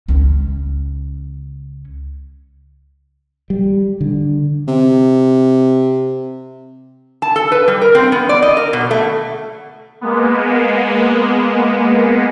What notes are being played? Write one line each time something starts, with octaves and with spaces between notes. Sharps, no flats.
C#2 C#4
G3
D3
C3
A5
A4
B4
G3
A#4
C4
B3
D5
D#5
A#4
B2
A3
G#3 A#3 B3